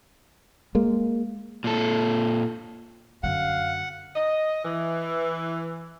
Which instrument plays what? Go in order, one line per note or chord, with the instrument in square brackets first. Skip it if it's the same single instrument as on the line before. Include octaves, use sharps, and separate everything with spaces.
[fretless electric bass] G#3 A#3
[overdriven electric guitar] A#2 A4
[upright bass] F#2 D3 [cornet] F5 [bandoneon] F#5
[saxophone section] D#5
E3